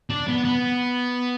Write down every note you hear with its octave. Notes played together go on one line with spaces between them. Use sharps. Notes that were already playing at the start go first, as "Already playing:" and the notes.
D4
B3
B3